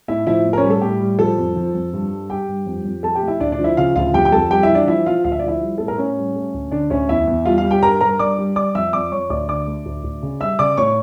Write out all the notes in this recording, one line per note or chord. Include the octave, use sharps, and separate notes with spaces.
A2 E4 E5
F3 E4 E5
A2
A#4
C#4 C#5
G3
A4
A2 G4
G3
F3 A4
F2
F3
F2
G2
G3
G3 G4 G5
G2
F2
F2
F2 A4 A5
G4 G5
A3
E4 E5
D2 D4 D5
D4 D5
F3
E4 E5
C#3 F4 F5
D2 F4 F5
F2 G4 G5
G5
F2 A4 A5
G3 G4 G5
E4 E5
E3
D4 D5
F3 E4 E5
F3 F4 F5
D2 F5
E5
D5
F3 E4 E5
G3
A2 A4
A#4
A2 C#4 C#5
G3
A3
D2
D3 D4 D5
D2 C#4 C#5
E2 E4 E5
E2
G3 F4 F5
F4 F5
G3
G4 G5
G2 A#4 A#5
G2 A#4 A#5
G2 D5 D6
G3
G3 D5 D6
F2 E5 E6
F2 D5 D6
F2 C#5 C#6
D2 D5 D6
D3 D5 D6
A3
D2
D2
C#3
G3 E5 E6
C#3 D5 D6
A2 C#5 C#6